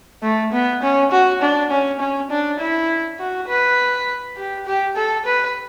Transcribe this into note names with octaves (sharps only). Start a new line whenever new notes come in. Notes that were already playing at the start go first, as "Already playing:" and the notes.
A3
B3
C#4
F#4
D4
C#4
C#4
D4
E4
F#4
B4
G4
G4
A4
B4